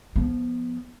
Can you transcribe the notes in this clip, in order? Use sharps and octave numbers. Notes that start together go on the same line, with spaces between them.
F3 B3